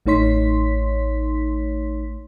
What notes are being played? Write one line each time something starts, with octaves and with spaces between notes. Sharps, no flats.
A1 A3 D#4 C#5 C6 B6